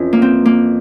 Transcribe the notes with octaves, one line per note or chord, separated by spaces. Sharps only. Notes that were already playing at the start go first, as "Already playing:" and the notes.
Already playing: F2 E3 C#4 E4
A#3
C4
A#3